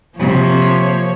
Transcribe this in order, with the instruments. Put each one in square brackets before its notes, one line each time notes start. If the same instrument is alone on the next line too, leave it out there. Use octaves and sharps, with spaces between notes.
[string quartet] C3 [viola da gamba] F3 A#3 C#5